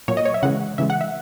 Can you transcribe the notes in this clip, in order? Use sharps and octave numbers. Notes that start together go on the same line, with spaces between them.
A#2 F#3 C#5
D#5
C#5
E5
C#3 E3 G#3 F#5
C#3 E3 G#3 E5
F#5
E5